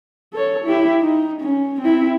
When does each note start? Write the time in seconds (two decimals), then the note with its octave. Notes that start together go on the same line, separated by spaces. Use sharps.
0.34 A4 C#5
0.65 E4 G4
1.01 D#4
1.41 C#4
1.81 C4 E4